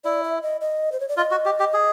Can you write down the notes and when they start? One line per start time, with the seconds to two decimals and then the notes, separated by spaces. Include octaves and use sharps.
0.04 E4 D5
0.23 E5
0.43 D#5
0.61 D#5
0.92 C5
1.00 C#5
1.09 D5
1.17 F4 D#5
1.31 F#4
1.45 G4
1.60 G4
1.74 G#4